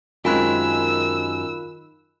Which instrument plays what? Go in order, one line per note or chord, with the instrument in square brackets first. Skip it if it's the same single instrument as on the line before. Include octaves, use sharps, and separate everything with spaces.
[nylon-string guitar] F#2 G#3 C4 [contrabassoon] D#3 [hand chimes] F4 B5 F#6 [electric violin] E6